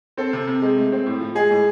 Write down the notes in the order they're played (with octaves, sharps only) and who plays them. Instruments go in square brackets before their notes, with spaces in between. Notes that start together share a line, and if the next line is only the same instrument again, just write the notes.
[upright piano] C4 A4
C3
C3
G#3
A3
C4
A2
F3
G#3 G#4
A2